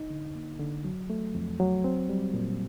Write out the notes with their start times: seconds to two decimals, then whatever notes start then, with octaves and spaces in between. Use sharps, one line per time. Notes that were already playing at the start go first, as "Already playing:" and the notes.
Already playing: D#4
0.10 D3
0.35 A#3
0.59 D3
0.85 F#3
1.10 A3
1.35 F2
1.60 F#3
1.84 C4
2.09 G3
2.34 A#2